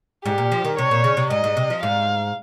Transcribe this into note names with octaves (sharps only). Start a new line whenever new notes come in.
G#2 G4
A#2
F3
D#3
C3 C#5
A#2
C#3
C3
G#2 D#5
G#2
C3
F3
G#2 F5